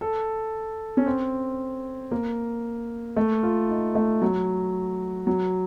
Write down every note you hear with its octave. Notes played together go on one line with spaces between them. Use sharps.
A4
C#4
C4
A#3
A3
F4
D#4
A3
F#3
F#3